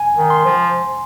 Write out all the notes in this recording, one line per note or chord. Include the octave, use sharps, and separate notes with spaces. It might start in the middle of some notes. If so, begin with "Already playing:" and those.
Already playing: G#5
D#3
C6
F3